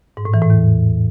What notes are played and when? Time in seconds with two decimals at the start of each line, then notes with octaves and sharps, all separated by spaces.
0.17 G#2
0.25 A2
0.34 E3
0.42 A2
0.50 E2